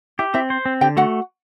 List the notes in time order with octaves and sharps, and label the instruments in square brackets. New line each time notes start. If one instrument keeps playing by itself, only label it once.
[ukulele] E4 E5 [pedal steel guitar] G4
[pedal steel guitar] C4 [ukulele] E4 E5
[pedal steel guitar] C5
C4
[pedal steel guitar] D3 [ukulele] G4 G5
[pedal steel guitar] A3 [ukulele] F#4 F#5